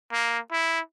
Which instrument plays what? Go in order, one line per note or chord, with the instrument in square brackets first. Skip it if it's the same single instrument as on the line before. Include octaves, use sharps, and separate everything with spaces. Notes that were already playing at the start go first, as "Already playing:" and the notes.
[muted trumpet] A#3
E4